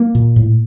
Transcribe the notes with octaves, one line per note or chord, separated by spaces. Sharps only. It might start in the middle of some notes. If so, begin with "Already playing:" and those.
Already playing: A#3
A#2
A2